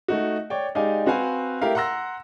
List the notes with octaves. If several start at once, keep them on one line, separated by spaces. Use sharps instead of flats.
A3 D#4 F#4
C#5 D5 G5
G#3 D#4 G4 D5 F5 G#5
C4 F#4 B4 F5 G#5
A3 E4 G4 A#4 F5
F#5 A#5 C6 E6 A#6